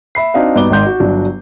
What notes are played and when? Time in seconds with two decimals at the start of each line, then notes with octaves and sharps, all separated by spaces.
0.15 E5 B5 C7
0.34 C4 D4 D#4 F#4 F5
0.55 G2 B3 D#4 F#4 D6 G7
0.70 G#1 G#2 D#4 C6 G6
0.86 F#4
1.00 G1 F#3 D4